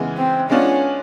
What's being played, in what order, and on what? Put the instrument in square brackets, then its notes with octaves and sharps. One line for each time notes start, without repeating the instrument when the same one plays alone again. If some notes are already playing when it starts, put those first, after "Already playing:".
Already playing: [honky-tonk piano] C#3 E3 G#3 B3
[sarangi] C4
[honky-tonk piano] G#3 B3 D4 F4 [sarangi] C#4